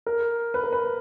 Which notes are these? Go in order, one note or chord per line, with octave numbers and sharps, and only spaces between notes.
A#4
B4
A#4
B4